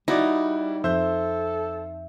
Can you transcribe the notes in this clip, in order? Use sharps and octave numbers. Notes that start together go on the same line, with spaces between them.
G3 D#4 E4 F#4 D5
F2 A4 C5 E5 G6